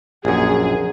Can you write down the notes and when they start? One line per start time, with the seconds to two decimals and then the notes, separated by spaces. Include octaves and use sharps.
0.25 A#1 F#2 G#4